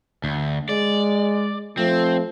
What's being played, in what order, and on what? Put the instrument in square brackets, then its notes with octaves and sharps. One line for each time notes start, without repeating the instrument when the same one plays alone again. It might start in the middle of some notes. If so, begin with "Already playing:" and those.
[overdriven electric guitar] D2
[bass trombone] G#3 [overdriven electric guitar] D5
[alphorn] F3 [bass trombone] A3 [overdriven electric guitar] C4